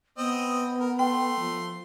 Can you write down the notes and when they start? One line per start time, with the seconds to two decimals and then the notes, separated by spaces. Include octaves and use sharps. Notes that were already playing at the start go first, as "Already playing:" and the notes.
0.18 B3 C4 D#5
0.80 A#4
0.99 A3 G5 C6
1.40 F3